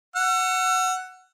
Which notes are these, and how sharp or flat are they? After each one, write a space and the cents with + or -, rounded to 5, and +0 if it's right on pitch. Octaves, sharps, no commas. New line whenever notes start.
F#5 +0 E6 +35